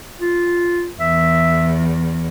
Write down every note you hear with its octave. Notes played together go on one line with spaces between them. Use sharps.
F4
E2 E5